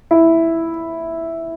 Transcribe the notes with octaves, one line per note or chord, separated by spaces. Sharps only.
E4